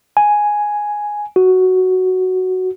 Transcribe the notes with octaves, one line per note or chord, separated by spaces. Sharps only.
G#5
F#4